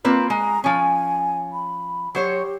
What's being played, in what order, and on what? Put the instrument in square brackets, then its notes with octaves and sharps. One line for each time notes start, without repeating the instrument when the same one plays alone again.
[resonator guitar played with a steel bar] A#3 C4 B4 [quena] F4
[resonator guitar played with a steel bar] G#3 [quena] A#5
[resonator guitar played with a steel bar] F3 C#4 [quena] G#5
[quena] B5
[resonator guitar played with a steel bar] F#3 C5 C#5 [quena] G4